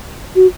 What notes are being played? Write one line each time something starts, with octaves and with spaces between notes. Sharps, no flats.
F#4